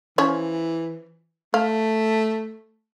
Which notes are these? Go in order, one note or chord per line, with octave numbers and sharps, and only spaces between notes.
E3 F3 C#4 C#5
A3 F5